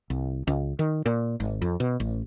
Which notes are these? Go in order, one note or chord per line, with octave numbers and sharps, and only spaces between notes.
C2
C#2
D#3
A#2
G#1
F2
B2
A1